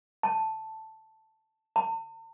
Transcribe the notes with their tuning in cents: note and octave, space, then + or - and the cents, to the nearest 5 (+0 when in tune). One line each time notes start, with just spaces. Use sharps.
A5 +0
A5 +45